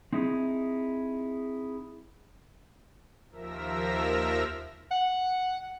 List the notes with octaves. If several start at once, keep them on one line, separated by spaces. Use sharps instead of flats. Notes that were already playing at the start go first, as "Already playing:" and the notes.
C4 D#4 E4 G#4
D#2 F3 A#4 E5 E6 A#6
F#5